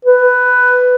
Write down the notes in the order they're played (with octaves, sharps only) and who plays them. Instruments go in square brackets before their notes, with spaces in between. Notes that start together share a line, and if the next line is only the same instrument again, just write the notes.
[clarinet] B4